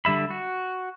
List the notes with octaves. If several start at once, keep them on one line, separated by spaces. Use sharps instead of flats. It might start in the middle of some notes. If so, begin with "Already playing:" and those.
D3 G3 E5 B5
F#4